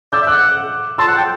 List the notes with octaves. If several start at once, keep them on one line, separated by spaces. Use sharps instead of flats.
D5 E6 G6
E5
D6 F#6
F#5
A5 C6 E6
F#5
G5